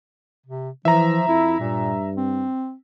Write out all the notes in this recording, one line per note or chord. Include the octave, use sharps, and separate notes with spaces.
C3
E3 F3 E5 A#5
F2 E4
G2 A#2
C4